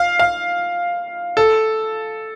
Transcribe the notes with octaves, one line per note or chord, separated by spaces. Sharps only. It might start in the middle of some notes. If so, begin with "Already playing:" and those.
Already playing: F5
F5
A4